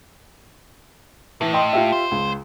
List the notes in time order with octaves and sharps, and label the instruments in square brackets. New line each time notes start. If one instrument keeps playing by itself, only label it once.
[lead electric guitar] A2 [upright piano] E3
[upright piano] D#5 G5 C6
F4 G4 E5
[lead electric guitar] C5
[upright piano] C#2